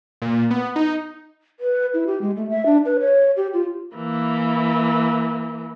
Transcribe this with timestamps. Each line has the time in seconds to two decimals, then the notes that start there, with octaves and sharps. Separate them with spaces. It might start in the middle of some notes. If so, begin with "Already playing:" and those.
0.22 A#2
0.50 B3
0.76 D#4
1.60 B4
1.94 E4
2.07 G4
2.21 G#3
2.36 A3
2.50 E5
2.66 D4
2.85 B4
3.00 C#5
3.36 G4
3.53 F4
3.96 E3 A#3